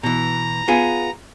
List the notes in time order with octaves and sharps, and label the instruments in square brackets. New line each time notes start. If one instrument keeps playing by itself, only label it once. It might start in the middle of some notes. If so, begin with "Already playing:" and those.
[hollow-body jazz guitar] B2 E3 [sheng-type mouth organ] A#5
[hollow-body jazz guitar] B3 F4 G#4